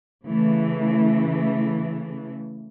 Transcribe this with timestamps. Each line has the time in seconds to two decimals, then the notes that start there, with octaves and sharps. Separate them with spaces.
0.25 C#3 E3 A3